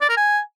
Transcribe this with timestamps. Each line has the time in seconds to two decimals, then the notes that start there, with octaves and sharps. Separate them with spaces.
0.01 D5
0.09 A#4
0.17 G#5